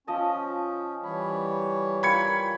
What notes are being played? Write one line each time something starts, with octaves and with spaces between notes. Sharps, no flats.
F3 C#4 D#5 A5
E3 G3 C#5 B5
F4 A#4 G5 B5 G#6 C#7